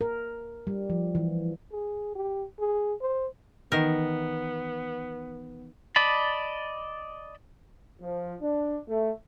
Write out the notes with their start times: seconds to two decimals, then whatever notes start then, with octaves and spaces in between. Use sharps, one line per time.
0.01 A#4
0.67 G3
0.90 F3
1.15 E3
1.72 G#4
2.15 G4
2.60 G#4
3.01 C5
3.72 D#3 E3 B3 D#4 A#4
5.96 D5 D#5 A5 B5
8.01 F3
8.42 D4
8.88 A3